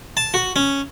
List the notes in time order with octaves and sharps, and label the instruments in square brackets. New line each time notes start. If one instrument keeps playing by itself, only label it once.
[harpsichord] A5
F#4
C#4